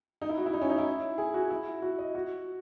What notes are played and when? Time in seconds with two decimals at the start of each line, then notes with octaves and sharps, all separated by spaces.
0.22 D#4
0.29 E4
0.37 F#4
0.46 E4
0.53 D#4
0.61 C#4
0.70 D#4
0.78 E4
1.18 G#4
1.34 F#4
1.50 E4
1.82 F#4
1.98 D#5
2.15 F#4